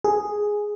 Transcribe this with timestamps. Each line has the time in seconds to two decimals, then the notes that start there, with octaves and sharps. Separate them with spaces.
0.04 G#4